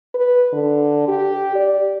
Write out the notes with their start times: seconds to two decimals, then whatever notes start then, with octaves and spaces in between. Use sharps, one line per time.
0.15 B4
0.53 D3
1.08 G4
1.56 D5